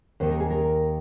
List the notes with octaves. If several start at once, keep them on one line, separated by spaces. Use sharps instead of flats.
D#2 D#3 C5
A#4
G#4
A#4